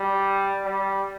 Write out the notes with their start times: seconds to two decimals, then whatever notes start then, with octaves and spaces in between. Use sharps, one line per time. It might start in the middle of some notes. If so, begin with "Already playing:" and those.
Already playing: G3
0.64 G3